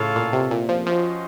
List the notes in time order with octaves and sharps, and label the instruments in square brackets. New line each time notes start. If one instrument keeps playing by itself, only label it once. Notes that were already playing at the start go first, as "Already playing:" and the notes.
Already playing: [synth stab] A2 C#3 [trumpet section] F4 A4 C#5 F5
[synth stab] A#2
C3
A#2
F3
[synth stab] F3 [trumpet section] C#4 F#4 C5 D#5